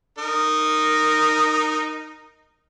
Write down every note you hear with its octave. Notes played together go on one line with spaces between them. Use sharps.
D#4 A#4